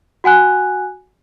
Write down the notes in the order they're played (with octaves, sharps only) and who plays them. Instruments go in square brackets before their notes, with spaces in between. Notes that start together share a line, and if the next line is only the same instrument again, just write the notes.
[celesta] F#4 F#5 G#5 F#6